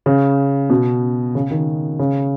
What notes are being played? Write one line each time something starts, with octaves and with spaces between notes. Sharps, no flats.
C#3
B2
C#3
D#3
C#3